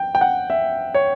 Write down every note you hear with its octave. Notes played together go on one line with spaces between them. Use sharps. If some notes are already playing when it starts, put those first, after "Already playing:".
Already playing: G5
G5
F#5
E5
C#5